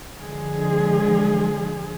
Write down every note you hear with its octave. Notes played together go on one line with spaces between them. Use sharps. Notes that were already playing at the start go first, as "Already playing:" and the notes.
D3 F3 G#3 G#4